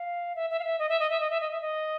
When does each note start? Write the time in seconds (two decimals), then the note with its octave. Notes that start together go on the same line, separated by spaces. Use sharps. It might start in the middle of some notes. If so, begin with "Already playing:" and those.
Already playing: F5
0.35 E5
0.50 E5
0.59 F5
0.64 E5
0.79 D#5
0.89 E5
1.00 D#5
1.10 E5
1.20 D#5
1.30 E5
1.41 D#5
1.51 E5
1.61 D#5